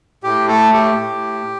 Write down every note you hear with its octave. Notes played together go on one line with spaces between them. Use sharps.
A2 G4
A3 A4
A2 G4
A2